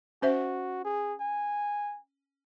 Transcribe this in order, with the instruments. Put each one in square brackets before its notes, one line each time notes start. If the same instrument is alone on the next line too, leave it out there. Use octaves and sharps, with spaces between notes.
[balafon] C#4 C5 E5 [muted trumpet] F#4
[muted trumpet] G#4
G#5